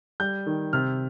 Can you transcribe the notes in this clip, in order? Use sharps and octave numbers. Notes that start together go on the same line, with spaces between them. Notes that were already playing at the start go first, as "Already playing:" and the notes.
G3 G6
D#3
C3 F6